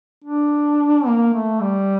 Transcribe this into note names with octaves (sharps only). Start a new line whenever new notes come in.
D4
A#3
A3
G3